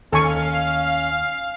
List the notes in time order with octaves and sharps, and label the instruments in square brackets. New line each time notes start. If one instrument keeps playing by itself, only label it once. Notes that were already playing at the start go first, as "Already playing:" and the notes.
[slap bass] D#2 D#3 [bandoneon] C#4 [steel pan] A4 G#5 C#6 [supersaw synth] F5